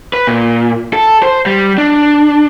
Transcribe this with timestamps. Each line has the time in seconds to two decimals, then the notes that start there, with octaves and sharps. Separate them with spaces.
0.13 B4
0.27 A#2
0.93 A4
1.23 C5
1.46 G3
1.78 D4